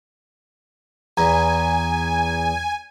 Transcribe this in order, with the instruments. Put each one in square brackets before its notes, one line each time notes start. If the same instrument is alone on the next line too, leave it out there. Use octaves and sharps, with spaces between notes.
[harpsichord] E2 [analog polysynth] G#5 [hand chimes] A#5